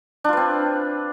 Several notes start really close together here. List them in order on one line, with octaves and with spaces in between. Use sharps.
D4 F4 B4 C4